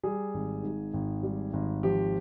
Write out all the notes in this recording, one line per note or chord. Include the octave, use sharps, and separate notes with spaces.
G3 G#4
G#1
G#2
G#1
G3
G#1
F3 G4